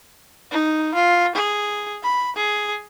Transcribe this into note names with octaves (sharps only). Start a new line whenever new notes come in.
D#4
F4
G#4
B5
G#4